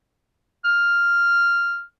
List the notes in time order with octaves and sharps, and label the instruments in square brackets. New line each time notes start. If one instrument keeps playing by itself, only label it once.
[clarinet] F6